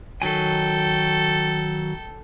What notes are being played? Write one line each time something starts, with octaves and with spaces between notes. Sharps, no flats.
D#3 F#3 A4 G5 G#5